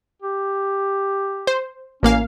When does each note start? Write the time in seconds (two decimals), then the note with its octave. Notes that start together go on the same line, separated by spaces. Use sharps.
0.22 G4
1.47 C5
2.03 A1 A#3 C#4 F5